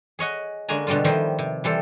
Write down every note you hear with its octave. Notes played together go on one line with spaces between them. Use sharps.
G#4 C#5 D#5 F#5
D3 G#3 A#3 C#4 G#5 A#5
B2 D3 G3 G#3 F4
D#3 F3 G3 B3 E4 C5
C3
E3 G3 A4 C5